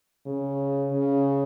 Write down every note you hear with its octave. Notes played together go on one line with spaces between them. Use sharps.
C#3
C#3